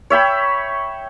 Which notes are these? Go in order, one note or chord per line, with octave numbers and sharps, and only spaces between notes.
C#5 E5 G5 B5